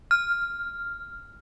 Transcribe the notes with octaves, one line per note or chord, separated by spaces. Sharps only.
F6